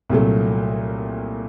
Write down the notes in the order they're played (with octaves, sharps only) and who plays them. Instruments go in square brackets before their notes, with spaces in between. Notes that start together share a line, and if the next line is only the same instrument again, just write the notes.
[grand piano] C2 A#2 F#3 A3